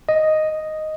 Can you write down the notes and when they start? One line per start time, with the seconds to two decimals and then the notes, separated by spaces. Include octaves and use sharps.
0.09 D#5